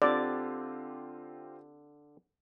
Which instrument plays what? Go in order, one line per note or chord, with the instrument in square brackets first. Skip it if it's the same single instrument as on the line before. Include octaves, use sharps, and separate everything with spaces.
[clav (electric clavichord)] D3 [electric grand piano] C4 F4 G4 [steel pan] D5